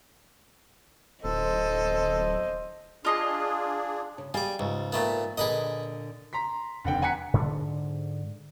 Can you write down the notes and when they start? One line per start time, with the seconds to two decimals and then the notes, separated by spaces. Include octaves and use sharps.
1.24 D1 A4 C5 D#5
3.05 D4 F4 G#4 D#5 C6
4.18 C#3
4.34 G3 G#4 F5 G#5 D6
4.59 C#2 G#2
4.92 A#2 A3 B3
5.38 A#2 D3 G#4 B4 D#5
6.33 A#5 C6 B6
6.85 F1 D3 F#5 G5
7.02 F#5 G#5 A#5 F#6 B6 C#7
7.33 G#2 D3 C4 D4